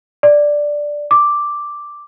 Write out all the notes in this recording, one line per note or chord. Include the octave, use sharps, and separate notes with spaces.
D5
D6